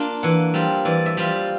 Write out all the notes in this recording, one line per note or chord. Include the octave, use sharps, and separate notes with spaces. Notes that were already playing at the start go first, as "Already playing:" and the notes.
Already playing: A#3 D4 F4
E3 F#5
G3 C4 F4
E3 D5
E5
G3 C4 F4